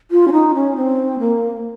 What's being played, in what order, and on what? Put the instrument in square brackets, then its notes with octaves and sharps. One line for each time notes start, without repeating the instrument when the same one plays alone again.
[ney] F4
C#4
D#4
C#4
C4
A#3